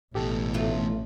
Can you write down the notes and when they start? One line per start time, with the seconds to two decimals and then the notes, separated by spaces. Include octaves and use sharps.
0.15 A1 B2 E3 G4 A4
0.54 E2 A3 F4